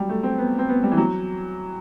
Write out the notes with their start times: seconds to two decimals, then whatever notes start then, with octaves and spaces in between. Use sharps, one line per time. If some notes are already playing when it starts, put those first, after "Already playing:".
Already playing: F#3 G3
0.09 A3
0.23 C4
0.38 B3
0.58 C4
0.69 B3
0.83 G3
0.92 E3
0.97 F#3